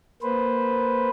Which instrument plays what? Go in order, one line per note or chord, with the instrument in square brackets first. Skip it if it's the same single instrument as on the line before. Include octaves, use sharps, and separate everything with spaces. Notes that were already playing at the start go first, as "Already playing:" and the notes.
[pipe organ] A#3 B4 C5